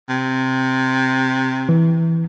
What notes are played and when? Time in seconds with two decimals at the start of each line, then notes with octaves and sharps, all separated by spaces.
0.09 C3
1.69 E3